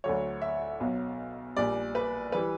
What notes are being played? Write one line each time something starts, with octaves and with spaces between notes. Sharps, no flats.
D2 D3 F#3 C#5
E5
B1 B2 F#3
A#1 A#2 G3 D5
B4
E3 G3 B4